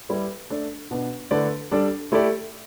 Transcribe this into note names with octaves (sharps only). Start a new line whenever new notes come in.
G3 E4 B4 D5
A3 D4 A4 D5
B2 B3 D4
D3 A3 E4 B4 D5
G3 D4 A4 D5
A3 E4 G4 D5